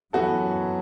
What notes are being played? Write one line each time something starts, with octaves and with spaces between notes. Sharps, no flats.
F#2 E3 F#3 B3 F#4 A4